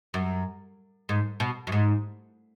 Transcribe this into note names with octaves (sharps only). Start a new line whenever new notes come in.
F#2
G#2
B2
F#2
G#2